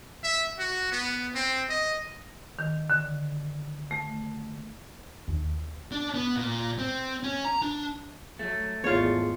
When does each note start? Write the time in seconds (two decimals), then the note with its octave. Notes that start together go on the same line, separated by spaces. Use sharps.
0.23 E5
0.59 F#4
0.92 B3
1.35 C4
1.70 D#5
2.59 D#3
2.90 D3
3.91 A3
5.28 D#2
5.92 D4
6.14 B3
6.37 A#2
6.79 C4
7.24 C#4
7.45 A#5
7.62 D4
8.39 F#3 A3
8.84 G#1 E2 F4 C#5